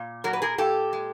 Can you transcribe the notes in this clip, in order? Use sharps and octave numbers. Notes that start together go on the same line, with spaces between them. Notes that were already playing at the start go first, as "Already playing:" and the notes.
Already playing: A#2
F#3 A#4
B4
G#4 A#4
A#2 G4 A4
G#3